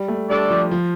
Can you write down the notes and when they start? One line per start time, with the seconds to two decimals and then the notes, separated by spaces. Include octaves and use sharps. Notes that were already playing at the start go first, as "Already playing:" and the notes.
Already playing: G3
0.08 A3
0.29 G3 A3 D4 A4 D5
0.50 F3
0.71 F3